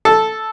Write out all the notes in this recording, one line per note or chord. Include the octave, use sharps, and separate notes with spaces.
A4